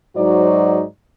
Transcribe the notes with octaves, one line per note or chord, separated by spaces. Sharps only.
G#2 F#3 D#4 F#4 C5 D5